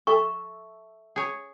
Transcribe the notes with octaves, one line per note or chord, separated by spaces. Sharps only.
A4 E5 A5 C#6
G#4 C#5